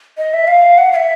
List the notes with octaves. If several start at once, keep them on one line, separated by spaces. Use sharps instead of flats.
D#5
E5
F5
F#5
F5
E5